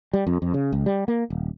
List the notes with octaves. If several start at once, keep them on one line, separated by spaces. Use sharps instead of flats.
G3
F2
F2
C#3
C#2
G3
A#3
D#1